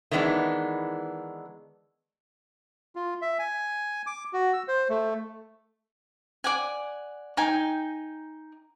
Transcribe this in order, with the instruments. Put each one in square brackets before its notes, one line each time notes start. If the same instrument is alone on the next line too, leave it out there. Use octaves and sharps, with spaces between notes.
[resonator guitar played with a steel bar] D#3 E3 G#3 B3 D4
[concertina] F4
E5
G#5
D6
F#4
E6
C5
A3
[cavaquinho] D5 F#5 G#5
D#4 G5 G#5